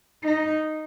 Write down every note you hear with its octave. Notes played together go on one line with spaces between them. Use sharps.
D#4